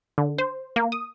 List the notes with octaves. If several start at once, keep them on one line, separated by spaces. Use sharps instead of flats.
D3
C5
A#3
D#6